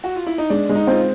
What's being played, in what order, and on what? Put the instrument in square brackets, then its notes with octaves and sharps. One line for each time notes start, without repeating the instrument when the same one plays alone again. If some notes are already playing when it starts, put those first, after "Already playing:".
[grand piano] F#4
F4
E4
D#4
[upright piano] G#3 [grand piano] D4
[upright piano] G#3
[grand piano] D#4
[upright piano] C4 [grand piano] F4